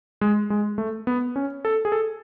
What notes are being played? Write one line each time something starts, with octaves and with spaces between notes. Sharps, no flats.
G#3
G#3
A3
B3
C#4
A4
G#4
A4